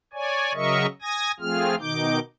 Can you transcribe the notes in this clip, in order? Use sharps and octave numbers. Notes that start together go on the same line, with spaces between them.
C#5 D5 G#5
C#3 F#3 A#4 D#5 E5 C#6
G#5 D#6 G#6 A#6
F3 A3 C4 F4 G#4 F6
B2 D#3 D#4 D6 G6